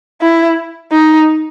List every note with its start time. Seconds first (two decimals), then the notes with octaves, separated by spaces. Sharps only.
0.21 E4
0.92 D#4